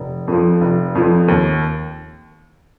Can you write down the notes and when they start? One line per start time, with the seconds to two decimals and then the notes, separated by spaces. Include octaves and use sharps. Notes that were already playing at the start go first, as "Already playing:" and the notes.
Already playing: F1
0.28 F2 F3
0.61 F1
0.95 F2 F3
1.28 D#2